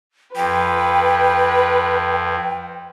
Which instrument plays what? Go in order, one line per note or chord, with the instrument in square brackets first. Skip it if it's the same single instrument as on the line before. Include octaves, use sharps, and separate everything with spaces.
[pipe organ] F2 [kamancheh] B4 [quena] G5